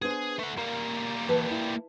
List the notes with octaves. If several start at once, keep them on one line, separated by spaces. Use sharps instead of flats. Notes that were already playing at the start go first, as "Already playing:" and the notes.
B3 D4 G#4 C5
A3 F#5
G3 A#3 A#4
E3 B4 A5
E4